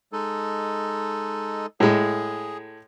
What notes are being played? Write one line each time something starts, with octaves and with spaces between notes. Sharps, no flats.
G#3 D#4 A4
A2 G#3 G#4